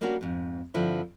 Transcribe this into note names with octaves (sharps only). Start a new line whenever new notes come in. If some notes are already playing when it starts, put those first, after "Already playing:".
G3 A#3 C#4 D4 F#4 A#4
F2 G#2
G2 D3 F3 C4 E4